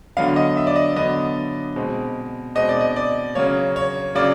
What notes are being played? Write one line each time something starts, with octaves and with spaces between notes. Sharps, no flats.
D3 F#3 B3 F5
D#5
E5
D5
D#5
D3 F#3 B3 D#5
B2 G#3 C4
B2 G#3 C4 D#5
D5
D#5
D5
C#3 F#3 A#3 C#5
C#5
C#3 F#3 A#3 D5